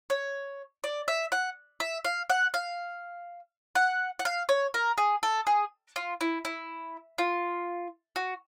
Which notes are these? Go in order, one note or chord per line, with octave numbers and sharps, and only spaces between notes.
C#5
D5
E5
F#5
E5
F5
F#5
F5
F#5
F#5
F5
C#5
A#4
G#4
A4
G#4
F4
E4
E4
F4
F#4